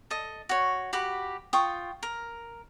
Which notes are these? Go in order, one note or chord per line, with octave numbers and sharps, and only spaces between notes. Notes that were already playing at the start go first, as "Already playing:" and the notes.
A4 D#5
F#4 C#5
F#4 G4 B5
F4 G5 C#6 D#6
A#4